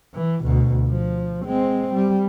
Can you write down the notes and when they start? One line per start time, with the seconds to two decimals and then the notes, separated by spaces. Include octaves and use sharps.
0.14 E3
0.43 D2 B2
0.88 F3
1.46 G#3 C4
1.94 G3